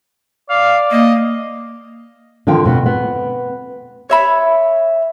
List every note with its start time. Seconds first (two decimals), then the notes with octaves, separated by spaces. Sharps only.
0.50 D5 F5
0.91 A#3 D#5
2.47 D3 D#3 F3 F4 G5
2.64 F2 B2 B3
2.86 B3
4.09 C#5 E5 B5